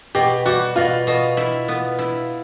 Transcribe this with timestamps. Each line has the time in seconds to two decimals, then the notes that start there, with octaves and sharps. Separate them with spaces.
0.15 B2 G4
0.46 G3 F#4
0.76 B2 F4
1.07 B2
1.37 E4
1.68 B3
1.99 E4